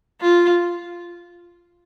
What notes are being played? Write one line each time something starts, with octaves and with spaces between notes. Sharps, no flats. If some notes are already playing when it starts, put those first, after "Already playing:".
F4